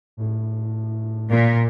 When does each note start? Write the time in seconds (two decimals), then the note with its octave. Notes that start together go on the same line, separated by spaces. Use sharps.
0.17 A2
1.30 A#2